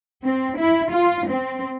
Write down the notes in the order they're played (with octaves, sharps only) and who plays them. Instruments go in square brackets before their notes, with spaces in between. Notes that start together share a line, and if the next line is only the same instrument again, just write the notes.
[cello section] C4
E4
F4
C4